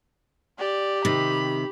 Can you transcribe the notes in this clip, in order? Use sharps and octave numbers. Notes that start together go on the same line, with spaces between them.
G4 D5
C3 D#3 B5